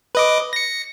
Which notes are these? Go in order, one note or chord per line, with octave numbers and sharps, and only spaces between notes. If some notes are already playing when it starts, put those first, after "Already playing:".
B4 D#5 D6
A#6 C#7